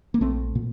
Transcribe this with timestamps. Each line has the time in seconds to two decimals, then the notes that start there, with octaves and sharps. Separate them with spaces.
0.14 A#3
0.21 A#1 A3 C4
0.55 A#2